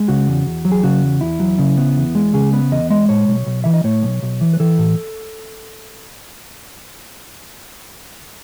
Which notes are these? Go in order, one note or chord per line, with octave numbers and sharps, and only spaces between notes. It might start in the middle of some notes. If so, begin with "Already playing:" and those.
Already playing: G#3
C#3 F#4
E2
E2
F#3
G#4
C#3 F#4
E2
E2 E4
F#3
C#3
B3
E2
G#3
C#3 G#4
B3 B4
E2 D#5
G#3 D#5
A2 C#5
B1
B1
E3 E5
D#5
A2 C#5
B1
B1
E3
B4
E3 A4
A2